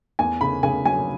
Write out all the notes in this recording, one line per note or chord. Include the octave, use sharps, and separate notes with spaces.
E2 G#5
C#3 B5
C#3 G#5
F#3 G#5